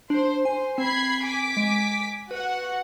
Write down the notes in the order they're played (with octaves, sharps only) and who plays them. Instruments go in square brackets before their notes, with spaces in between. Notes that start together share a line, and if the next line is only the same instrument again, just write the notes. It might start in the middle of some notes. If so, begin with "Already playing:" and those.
[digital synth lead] D4 [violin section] C5
[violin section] C5 [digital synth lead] G#5
[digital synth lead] C4 [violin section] B5 G#6 C7
[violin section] G#5 D6 B6
[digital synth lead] G#3
[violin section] F#4 F#5 [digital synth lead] B4